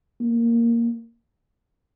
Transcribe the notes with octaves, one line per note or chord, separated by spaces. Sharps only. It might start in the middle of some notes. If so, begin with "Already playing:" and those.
A#3